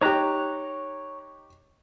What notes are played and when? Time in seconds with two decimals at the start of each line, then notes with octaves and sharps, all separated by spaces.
0.01 D#4 G4 C#5 A#5 F#6